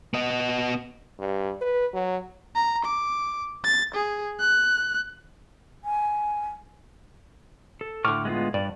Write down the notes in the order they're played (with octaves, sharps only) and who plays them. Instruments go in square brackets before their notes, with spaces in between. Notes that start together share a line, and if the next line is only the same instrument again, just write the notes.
[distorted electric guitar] B3 D#5
[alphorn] G2
B4
F#3
[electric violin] A#5
D6
A6
G#4
F#6
[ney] G#5
[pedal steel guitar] A4
[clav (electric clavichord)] A2 D3 [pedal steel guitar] C#6 D6 F6
[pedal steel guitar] G#3 B3 F4
[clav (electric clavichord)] G2 [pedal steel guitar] D5